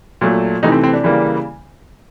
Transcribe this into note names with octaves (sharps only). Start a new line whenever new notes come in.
A#2 F#3 A3
C3 E3 A3 D#4
C4
C4
D4
C#3 E3 G3 A#3